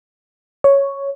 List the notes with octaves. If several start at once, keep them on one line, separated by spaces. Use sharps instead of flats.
C#5